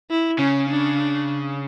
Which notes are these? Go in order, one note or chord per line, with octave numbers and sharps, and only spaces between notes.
E4
C#3 C#4
D4